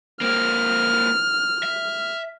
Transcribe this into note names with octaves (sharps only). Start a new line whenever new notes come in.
A#3 C4 F6
E5